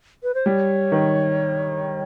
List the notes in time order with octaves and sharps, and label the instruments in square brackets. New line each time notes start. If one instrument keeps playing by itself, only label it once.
[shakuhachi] B4
C5
[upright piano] G3 [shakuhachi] C#5
[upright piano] D#3